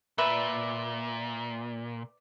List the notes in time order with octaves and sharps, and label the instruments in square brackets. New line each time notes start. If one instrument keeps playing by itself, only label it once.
[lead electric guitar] A#2 [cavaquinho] B4 D5 E5